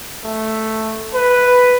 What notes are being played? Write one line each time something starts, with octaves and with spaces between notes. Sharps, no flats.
A3
B4